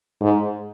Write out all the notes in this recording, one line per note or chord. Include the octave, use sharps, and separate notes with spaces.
G#2